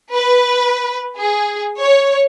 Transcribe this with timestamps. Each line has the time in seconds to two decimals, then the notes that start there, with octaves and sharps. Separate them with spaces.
0.15 B4
1.17 G#4
1.81 C#5